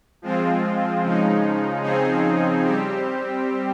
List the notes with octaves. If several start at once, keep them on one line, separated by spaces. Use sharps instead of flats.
F3 G#3 C4 F4
C#3 F3 G#3 D#4
C#3 F3 C4 D#4 G#4
G3 C4 G4